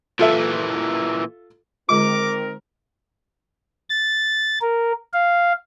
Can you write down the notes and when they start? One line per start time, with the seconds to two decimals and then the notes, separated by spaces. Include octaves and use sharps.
0.19 A#2 E3 F4 A4 E5
1.89 D3 D#3 G#3 C4 F4 A#4 D6
3.90 A6
4.61 A#4
5.13 F5